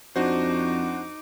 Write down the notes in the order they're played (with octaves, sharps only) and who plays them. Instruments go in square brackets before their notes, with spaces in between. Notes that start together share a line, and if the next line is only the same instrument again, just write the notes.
[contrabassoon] F2 [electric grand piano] D4 F#4 C5 [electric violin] D#4 D6